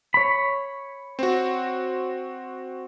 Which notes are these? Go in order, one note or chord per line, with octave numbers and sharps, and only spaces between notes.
C#5 B5
C4 F#4